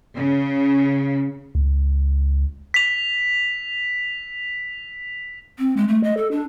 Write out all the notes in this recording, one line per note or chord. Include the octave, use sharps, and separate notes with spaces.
C#3
C#2
B6 F7
C4
G#3
A3
D#5
A4
D4